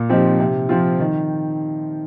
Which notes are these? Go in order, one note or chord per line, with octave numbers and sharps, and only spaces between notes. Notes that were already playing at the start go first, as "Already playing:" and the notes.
Already playing: A#2
F3 C4 D#4 G4
C3
F3 C4 F4
D#3